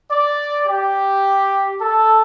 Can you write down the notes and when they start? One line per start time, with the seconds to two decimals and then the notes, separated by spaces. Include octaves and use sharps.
0.11 D5
0.68 G4
1.81 A4